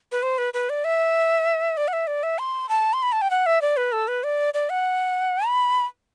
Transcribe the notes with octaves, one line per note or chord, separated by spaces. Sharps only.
B4
C5
B4
B4
D5
E5
D5
F#5
E5
D5
E5
C6
A5
C6
B5
A5
G5
F#5
E5
D5
B4
A4
B4
D5
D5
F#5
B5